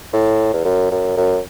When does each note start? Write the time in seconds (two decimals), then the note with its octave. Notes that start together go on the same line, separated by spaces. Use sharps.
0.13 A2
0.54 E2
0.65 F#2
0.91 F#2
1.17 F#2